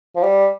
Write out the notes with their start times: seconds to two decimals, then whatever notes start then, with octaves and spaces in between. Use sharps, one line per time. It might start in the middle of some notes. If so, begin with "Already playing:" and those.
0.15 F3
0.23 G3